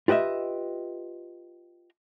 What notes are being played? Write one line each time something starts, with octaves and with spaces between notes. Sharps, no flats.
F4 G4 B4 D#5 E5